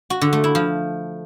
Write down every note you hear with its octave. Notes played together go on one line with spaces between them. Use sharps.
F#4
D3
A3
E4
F3